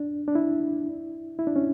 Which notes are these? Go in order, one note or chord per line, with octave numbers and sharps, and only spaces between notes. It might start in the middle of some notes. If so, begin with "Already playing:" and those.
Already playing: D4
D4
E4
E4
D4
C#4